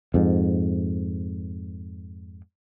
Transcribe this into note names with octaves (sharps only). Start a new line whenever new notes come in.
F2 G#2